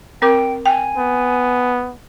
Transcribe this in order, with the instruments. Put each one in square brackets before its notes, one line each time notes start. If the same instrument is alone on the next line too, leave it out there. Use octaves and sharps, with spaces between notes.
[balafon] C4 A#4 D6 [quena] G5
[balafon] G5 [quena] G#5
[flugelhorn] B3